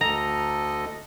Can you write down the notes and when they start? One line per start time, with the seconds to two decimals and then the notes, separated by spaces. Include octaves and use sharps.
0.01 D2 A4 D#5 A#5